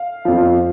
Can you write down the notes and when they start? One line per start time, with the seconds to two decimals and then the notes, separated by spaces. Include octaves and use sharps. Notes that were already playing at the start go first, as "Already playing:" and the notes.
Already playing: F5
0.25 F2 F3